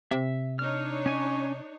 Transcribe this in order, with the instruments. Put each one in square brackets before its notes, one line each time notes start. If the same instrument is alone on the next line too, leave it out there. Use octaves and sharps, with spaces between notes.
[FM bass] C3 [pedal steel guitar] E5
[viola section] D4 D#4 C#5 [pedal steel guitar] F6
[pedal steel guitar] C#4 G#5 C#6